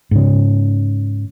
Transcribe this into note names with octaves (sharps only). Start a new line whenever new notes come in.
G#2 C#3